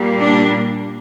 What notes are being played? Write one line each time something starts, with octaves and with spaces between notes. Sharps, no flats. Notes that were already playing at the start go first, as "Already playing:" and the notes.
Already playing: A#2 G3 A#3
D4